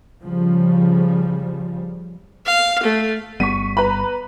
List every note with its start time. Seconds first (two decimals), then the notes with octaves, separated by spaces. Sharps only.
0.25 C#3 F3 G3
2.46 F5
2.83 A3
3.40 G1 G3 B3 C#6 B6 D#7
3.77 B4 A#5 B5